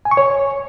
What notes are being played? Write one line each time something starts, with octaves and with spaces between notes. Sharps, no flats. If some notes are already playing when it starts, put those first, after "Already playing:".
G#5
C#6
C#5